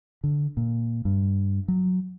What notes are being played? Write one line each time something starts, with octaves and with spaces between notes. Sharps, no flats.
D3
A#2
G2
F#3